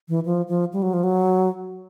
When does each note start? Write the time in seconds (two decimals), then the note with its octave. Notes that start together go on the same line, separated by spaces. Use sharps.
0.09 E3
0.25 F3
0.48 F3
0.73 G3
0.82 F#3
0.93 F3
1.04 F#3